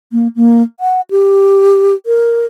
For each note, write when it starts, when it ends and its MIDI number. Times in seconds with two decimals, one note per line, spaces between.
0.12 0.27 58
0.36 0.62 58
0.80 1.01 78
1.11 1.94 67
2.06 2.46 70